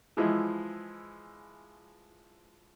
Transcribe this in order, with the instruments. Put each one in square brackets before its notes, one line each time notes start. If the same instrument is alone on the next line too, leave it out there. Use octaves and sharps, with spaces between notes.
[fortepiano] E3 F3 G#3 E4